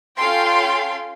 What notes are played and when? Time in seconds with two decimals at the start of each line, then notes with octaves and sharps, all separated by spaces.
0.17 C#4 F4 A4 F5 G5 C6